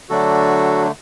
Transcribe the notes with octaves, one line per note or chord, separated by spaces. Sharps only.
D3 F#3 A3 D4 F#4 A4